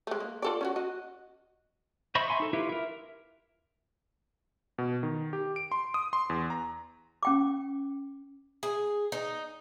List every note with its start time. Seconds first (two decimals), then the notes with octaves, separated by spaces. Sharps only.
0.07 G#3 A3
0.20 A#3
0.42 F4 A4 D5
0.61 C#4 D#4 F#4
0.76 F#4 D#5
2.15 C5 D#5 E5 B5 C#6
2.28 E5 F5 G#5 C6 C#6
2.40 D#4 A4
2.53 E4 F4 G4 B4 E5
2.69 A#4 E5
4.78 B2
5.03 D#3
5.33 G4
5.56 D7
5.72 C6
5.94 D#6
6.13 C6
6.30 E2
6.50 A#5
7.23 C#4 G5 D6
8.63 G#4
9.12 D#4